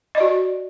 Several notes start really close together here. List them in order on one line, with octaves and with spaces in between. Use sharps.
D#5 D5 F#4